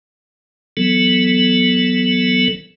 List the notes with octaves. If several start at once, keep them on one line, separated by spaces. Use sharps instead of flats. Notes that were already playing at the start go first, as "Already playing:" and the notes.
E3 F#3 B3 A4